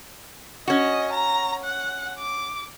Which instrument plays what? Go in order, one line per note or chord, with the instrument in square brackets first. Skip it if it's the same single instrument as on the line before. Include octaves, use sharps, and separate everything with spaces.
[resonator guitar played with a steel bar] C#4 F#4 [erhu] D#5
[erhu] A#5
F#5
D6